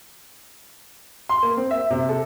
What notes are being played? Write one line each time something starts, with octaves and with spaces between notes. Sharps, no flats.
C6
A#3
C4
E5
C3
A4